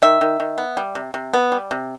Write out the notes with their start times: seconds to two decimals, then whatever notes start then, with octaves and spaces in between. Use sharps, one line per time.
0.02 D#3 E5
0.21 D#3
0.40 D#3
0.58 B3
0.77 G3
0.95 C3
1.14 C3
1.34 B3
1.52 G3
1.71 C3